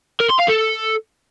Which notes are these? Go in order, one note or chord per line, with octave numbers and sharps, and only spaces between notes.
A#4
C6
F5
A4